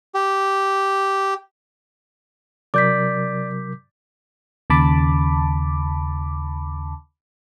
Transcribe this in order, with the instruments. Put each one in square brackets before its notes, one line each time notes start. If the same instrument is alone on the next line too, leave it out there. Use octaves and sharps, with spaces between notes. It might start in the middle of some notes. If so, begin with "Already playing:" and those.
[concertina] G4
[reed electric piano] C3 F#3 A#4 [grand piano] D5 [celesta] D6 G6 B6
[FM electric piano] D#2 C#3 A5 B5 D6